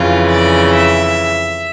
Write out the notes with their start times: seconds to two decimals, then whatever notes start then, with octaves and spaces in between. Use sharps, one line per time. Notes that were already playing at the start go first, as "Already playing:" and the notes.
Already playing: F2 C#3 E3 F4
0.32 D5
0.75 E5